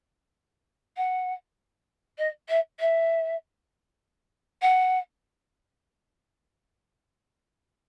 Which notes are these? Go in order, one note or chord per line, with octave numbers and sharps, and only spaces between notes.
F#5
D#5
E5
E5
F#5